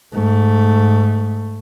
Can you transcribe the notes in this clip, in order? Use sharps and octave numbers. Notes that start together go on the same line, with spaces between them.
G#2 A3